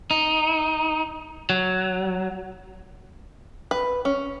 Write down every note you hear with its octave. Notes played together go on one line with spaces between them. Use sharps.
D#4
F#3
B4
C#4